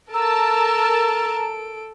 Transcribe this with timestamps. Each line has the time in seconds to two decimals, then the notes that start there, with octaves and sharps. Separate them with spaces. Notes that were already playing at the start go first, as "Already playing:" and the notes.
0.14 A4 A#4 A5 A#5 E6 D7